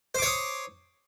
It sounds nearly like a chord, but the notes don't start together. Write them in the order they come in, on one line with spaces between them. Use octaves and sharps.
C5 D6 C#5 D#6